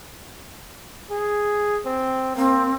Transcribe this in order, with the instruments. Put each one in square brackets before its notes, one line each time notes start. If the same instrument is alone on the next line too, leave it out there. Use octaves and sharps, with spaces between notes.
[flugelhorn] G#4
C4
[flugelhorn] A#3 [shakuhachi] C4